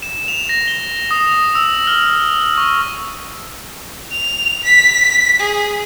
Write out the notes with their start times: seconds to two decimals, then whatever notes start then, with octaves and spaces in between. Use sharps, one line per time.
0.02 E7
0.28 F7
0.49 A#6
0.68 G7
1.11 D#6
1.55 E6
1.87 F6
2.58 C#6
4.12 F7
4.64 B6
5.40 G#4